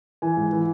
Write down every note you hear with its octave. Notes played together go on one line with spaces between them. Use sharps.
E3 G#5
G#2
E3